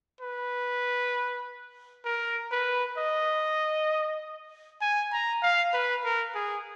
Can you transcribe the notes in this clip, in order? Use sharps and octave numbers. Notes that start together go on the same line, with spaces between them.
B4
A#4
B4
D#5
G#5
A#5
F5
B4
A#4
G#4